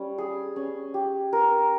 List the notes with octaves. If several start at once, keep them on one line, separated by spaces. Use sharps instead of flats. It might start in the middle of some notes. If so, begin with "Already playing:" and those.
Already playing: G3 C#4
G#4
C#4
G4
A#4